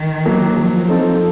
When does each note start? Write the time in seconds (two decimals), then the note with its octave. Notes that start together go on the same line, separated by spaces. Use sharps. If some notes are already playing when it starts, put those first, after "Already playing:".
Already playing: D#3
0.26 F#3 A#3
0.56 F3 F#3
0.88 C4 D#4 A4